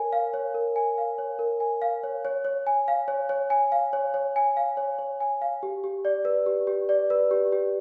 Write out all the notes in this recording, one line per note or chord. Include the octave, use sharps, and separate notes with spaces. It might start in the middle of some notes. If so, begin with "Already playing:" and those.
Already playing: A#4 C#5 G#5
F5
C#5
A#4
G#5
F5
C#5
A#4
G#5
F5
C#5
C#5
C#5
G#5
F5
C#5
C#5
G#5
F5
C#5
C#5
G#5
F5
C#5
C#5
G#5
F5
G4
G4
D5
B4
G4
G4
D5
B4
G4
G4